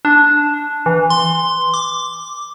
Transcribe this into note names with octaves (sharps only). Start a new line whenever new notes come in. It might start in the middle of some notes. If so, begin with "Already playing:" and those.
D4
E3
C6
D6